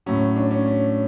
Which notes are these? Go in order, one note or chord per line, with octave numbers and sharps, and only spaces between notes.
A2 F#3 C#4
D4
C#4
C#4